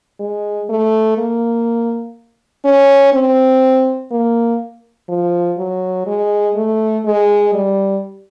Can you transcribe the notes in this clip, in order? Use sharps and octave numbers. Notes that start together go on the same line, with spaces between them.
G#3
A3
A#3
C#4
C4
A#3
F3
F#3
G#3
A3
G#3
G3